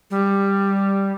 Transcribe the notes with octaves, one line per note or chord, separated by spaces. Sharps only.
G3